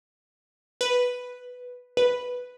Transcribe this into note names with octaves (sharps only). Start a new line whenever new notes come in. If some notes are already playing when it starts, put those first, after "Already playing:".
B4
B4